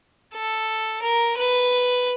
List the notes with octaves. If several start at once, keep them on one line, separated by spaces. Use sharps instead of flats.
A4
A#4
B4